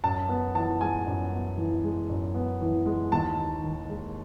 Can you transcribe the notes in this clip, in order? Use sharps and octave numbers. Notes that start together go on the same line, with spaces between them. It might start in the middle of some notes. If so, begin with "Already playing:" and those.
F#2 A5
B3
E3 A5
G#3 G#5
F#2
B3
E3
G#3
F#2
B3
E3
G#3
D#2 A5
D#4
D#3
G#3